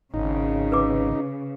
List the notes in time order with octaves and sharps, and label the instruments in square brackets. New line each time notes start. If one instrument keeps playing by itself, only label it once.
[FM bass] G#1 [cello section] C#3 [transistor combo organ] D#4
[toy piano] B4 D6